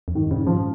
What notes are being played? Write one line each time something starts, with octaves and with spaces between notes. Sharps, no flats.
F2
G#2 D#3
G#2 C#3
G#2 F3